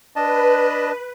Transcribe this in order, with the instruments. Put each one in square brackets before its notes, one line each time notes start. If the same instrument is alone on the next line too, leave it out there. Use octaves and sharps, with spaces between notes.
[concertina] D4 D#5 A5 [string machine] B4